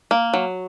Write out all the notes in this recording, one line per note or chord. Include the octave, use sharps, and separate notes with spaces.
A#3
F#3